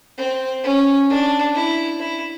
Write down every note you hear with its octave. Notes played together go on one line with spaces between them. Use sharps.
C4
C#4
D4
E4
E4